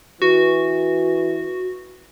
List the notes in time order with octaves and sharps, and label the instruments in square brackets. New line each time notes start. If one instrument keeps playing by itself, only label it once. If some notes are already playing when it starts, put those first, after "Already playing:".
[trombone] E3 [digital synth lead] F#4